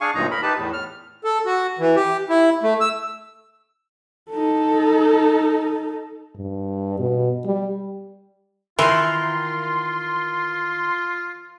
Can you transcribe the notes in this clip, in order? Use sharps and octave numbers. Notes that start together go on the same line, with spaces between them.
D4 G#4 F5 G#5 C#6
D2 G2 A#2 F#3 D#4 A#5
A#4 B5
D#4 G4 B4 A5
E2 A2
F6
A4
F#4
E3
G4
E4
A3
E6
D#4 A4
G2
B2
G3
D#3 E3 F4 A#4 C6